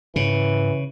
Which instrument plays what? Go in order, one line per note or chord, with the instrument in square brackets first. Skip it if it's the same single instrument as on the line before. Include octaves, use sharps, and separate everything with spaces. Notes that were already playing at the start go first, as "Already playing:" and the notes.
[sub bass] G#2 [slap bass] C#3 [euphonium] E3